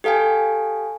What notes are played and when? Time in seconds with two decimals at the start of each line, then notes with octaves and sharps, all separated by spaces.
0.04 G4 A4 F5 G5 G#5